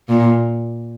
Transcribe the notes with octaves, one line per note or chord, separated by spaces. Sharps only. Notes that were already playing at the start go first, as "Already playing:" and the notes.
A#2